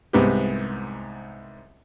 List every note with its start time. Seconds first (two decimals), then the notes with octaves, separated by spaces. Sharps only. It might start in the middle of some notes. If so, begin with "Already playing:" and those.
0.13 C2 G#2 B3 C4 G4